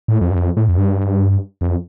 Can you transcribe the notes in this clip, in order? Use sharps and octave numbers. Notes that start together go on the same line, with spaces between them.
A2
F2
G2
F2
A2
F2
G2
F2